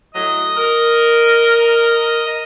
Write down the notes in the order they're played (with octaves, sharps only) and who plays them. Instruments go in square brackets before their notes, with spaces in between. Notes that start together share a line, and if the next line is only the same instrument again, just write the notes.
[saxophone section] A2 F#3 [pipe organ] D#5
[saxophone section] A#4